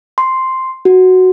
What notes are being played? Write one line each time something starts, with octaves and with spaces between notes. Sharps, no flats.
C6
F#4